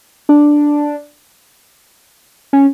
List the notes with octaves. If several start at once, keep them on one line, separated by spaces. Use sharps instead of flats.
D4
C#4